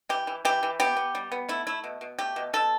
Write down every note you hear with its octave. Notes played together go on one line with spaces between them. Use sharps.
E3 G4
E3
E3 G4
E3
B3 G4
B3
G3
B3
A3 E4
A3 E4
B2
B2
A3 G4
B2
B2 A4